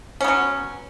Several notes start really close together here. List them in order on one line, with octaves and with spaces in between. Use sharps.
C#4 B3 F#3